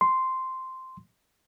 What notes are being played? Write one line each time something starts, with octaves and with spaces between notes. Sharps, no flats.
C6